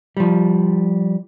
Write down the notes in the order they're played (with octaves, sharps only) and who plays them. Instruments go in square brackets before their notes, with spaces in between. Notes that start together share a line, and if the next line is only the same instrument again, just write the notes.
[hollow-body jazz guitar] F3 G3